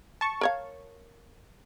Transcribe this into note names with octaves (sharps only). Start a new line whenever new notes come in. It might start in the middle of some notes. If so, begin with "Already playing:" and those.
A5 C#6
A#4 C#5 F5